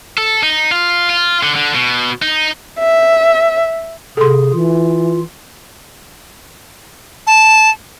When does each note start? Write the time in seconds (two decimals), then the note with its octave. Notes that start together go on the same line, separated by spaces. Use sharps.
0.17 A4
0.43 D#4
0.71 F4
1.10 F4
1.43 D3
1.56 D3
1.75 B2
2.22 D#4
2.78 E5
4.17 C3 G#4 A4 C6
4.52 E3 F4
7.27 A5